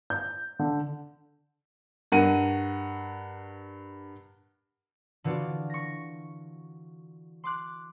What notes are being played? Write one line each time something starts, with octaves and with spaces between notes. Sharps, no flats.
G6
D3
G2 A#4 F#5 D#7
D3 E3 F4 F#4 D5
C#6 A#6
C6 D6 F#6